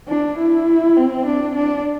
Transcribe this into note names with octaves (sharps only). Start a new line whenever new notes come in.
D4
E4
C4
D4
D4